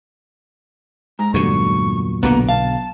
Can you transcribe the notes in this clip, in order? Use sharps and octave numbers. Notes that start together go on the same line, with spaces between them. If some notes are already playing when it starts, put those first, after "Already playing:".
G#2 A#5
E2 G2 A#2 D3 F#3 C#6
B1 B2 D3 A#3 B3 A#5
F5 A5